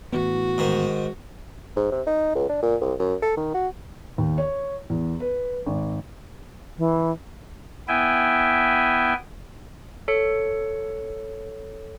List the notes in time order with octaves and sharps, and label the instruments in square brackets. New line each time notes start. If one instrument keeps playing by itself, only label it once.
[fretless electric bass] A2 E3 B3 [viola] F#4
[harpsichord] G#2 D#3
[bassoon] G#2
C3
D#4
C#2
D4
A#2
C2
F#2
A4
D#3
F#4
[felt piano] D#2
C#5
E2
B4
G#1
[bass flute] E3
[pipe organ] B3 E4 E5 G5 G#5
[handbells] A4 C#5 C#7